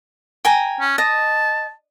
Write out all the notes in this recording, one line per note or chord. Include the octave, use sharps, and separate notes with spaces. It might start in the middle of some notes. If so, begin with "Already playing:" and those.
G5 G#5 A#5
C#4
D#5 A5